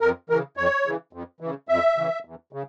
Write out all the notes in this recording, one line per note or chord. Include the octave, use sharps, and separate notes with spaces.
F2 A#4
C#3 E3 A#4
F2 C#5
C#3 E3
F2
C#3 E3
F2 E5
C#3 E3
E2
C#3